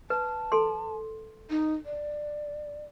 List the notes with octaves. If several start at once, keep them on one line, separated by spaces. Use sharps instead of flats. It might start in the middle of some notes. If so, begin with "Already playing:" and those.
B4 A5
A4 C6
D#4
D5